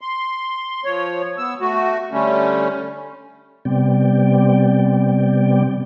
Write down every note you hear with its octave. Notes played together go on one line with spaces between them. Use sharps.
C6
F3 C#5
B3 E6
A3 F#4
D3 G3 A3 C#4
C3 G3 B3 C4 D5 G5